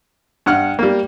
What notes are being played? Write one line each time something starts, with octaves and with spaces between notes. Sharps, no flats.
G2 F#5 F6
G3 A#3